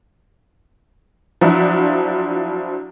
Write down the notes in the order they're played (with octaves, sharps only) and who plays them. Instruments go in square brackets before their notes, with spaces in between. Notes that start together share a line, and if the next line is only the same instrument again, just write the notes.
[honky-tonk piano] F3 F#3 D4 E4